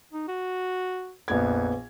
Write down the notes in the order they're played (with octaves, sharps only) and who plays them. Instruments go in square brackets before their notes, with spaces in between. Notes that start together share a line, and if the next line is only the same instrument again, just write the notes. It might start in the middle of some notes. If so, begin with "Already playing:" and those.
[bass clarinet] D#4
F#4
[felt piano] A#1 B3 G#6 [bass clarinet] F2